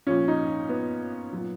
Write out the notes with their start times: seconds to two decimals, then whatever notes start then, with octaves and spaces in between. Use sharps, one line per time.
0.07 A#2 F3 C#4
0.28 D#4
0.69 B3
1.33 A#2 F#3